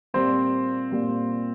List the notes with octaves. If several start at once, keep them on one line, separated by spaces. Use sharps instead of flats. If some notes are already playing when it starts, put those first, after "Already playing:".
A#2 G3 A#3 C4 C5
A#2 G3 A#3